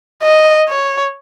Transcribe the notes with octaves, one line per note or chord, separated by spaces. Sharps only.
D#5
C#5